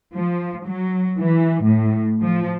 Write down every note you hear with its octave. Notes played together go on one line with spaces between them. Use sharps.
F3
F#3
E3
A2
F3